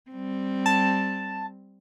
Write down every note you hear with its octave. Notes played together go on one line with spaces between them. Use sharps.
G3 C4
A5